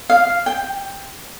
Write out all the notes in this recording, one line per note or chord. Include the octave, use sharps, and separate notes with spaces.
F5
G5